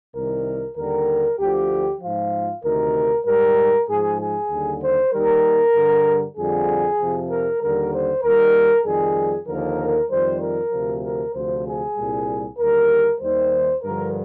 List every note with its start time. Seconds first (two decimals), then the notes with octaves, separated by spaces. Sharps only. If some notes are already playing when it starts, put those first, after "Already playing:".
0.14 C2 C3 D#3 G3 A#4
0.76 D#2 D3 G3 A#4
1.39 D2 D3 F3 G4
2.01 G#2 F3 F4
2.63 D2 C3 D#3 A#4
3.25 G#2 G3 A#4
3.88 G#2 F3 G#4
4.19 G#4
4.50 D#2 D3 G3
4.81 C5
5.12 D#2 D#3 G3 A#4
5.74 G2 D3 G3
6.36 F2 D3 G3 G#4
6.99 F2 C3 F3
7.29 A#4
7.61 D#2 D3 G3 A#4
7.92 C5
8.23 D#2 D#3 G3 A#4
8.85 F2 D#3 G3 G#4
9.47 D#2 D3 F3 A#4
10.09 F2 D#3 G3 C5
10.41 A#4
10.72 D2 C3 F3
11.03 A#4
11.34 D2 C3 F3 C5
11.66 G#4
11.97 C2 A#2 G3
12.58 D#2 D3 G3 A#4
13.20 D#2 D#3 G3 C5
13.83 G2 D3 F3 A#4